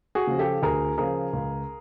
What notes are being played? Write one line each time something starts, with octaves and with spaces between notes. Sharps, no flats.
F#4 G#4
C#3 F3
G4 A4
D2 G#4 A#4
C#3 F3 G#4 A#4
C#2